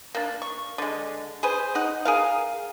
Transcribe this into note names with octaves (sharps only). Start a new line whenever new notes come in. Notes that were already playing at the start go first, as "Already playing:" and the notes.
A#3 D4
C#6
D3 G#3
G#4 B4 C5
D#4 F#5
G#4 A#4 F5